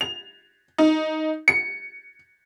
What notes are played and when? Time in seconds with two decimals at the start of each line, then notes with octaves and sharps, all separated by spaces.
0.01 F7
0.78 D#4
1.48 C#7